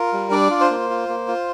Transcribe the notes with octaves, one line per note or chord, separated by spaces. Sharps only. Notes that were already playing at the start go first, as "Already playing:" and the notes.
Already playing: F4 A#4
G3
D4 D5
F4
C5
A#3
F4
A#3
F4